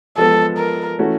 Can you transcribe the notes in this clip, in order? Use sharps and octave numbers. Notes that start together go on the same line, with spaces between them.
F3 G#3 B3 A4
A#4
E3 A3 C#4 F#4